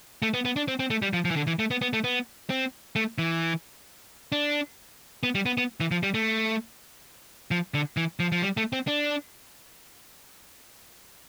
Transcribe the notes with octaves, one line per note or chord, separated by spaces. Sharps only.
A3
B3
B3
D4
C4
C4
A3
G3
F3
F3
E3
D3
E3
A3
B3
B3
A3
B3
C4
A3
E3
D4
B3
G3
B3
B3
E3
F3
G3
A3
F3
D3
E3
F3
F3
G3
A3
C4
D4